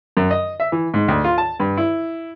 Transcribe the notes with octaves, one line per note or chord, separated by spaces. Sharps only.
F#2
D#5
E5
E3
G#2
D2
F4
A5
G2
E4